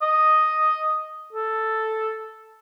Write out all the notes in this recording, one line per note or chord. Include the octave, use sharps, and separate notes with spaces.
D#5
A4